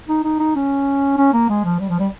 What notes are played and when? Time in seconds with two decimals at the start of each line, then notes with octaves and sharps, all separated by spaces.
0.08 D#4
0.24 D#4
0.39 D#4
0.56 C#4
1.17 C#4
1.33 A#3
1.49 G#3
1.65 F3
1.80 G3
1.89 F3
2.00 G3